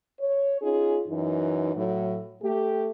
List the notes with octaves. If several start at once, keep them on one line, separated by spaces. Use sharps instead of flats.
C#5
C#4 D#4 F4 G#4
F#2 E3 D#4
A2 F#3
A3 G4